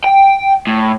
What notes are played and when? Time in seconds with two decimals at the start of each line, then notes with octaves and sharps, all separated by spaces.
0.04 G5
0.67 A2